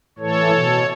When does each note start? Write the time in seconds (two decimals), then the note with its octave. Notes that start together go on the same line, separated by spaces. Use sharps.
0.19 A2 E3 A4 C#5
0.51 B2